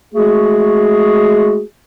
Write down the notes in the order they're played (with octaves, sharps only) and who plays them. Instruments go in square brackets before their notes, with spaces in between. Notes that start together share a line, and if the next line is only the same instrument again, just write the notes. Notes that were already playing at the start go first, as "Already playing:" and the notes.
[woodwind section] G#3 A3 F#4 G#4